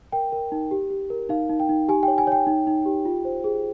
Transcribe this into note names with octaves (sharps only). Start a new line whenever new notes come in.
A#4 G5
A#4
D#4
G4
G4
A#4
D#4 F5
D#4
G5
D#4
G4 G#5
C#5 G5
G#5
C#5 G5
D#4
D#4
G4
F4
C5
G#4